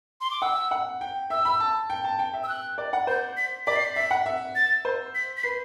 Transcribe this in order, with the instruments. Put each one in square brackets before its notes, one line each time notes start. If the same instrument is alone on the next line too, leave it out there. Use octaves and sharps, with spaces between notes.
[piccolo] C6
D6
[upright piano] F#5 [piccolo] E6
[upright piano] F#5
G5
[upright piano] E5 [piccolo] E6
[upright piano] B5
A5
G5
A5
G5
E5
[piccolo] E6
F#6
[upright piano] D5
F#5
[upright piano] C5 [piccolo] G6
[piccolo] B6
[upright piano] D5 [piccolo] B6
[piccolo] C7
B6
[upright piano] E5 [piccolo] B6
[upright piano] F#5
E5
[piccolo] A6
[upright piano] C5
[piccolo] B6
B6
[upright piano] B4 [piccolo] C7